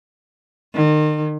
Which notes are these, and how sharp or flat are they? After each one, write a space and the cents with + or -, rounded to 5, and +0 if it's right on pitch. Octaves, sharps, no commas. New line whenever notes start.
D#3 -35